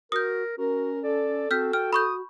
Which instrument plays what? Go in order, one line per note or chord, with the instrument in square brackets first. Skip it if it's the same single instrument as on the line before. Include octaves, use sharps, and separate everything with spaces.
[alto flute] F#4 [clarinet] A#4 [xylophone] D#6 G6
[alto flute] C#4 [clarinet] F#4 [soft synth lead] A#4
[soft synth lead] A4 [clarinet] D5
[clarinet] C4 [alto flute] F#4 [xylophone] F6 G6 B6
[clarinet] G5 [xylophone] F6
[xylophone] B5 C#6 G6 [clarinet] D#6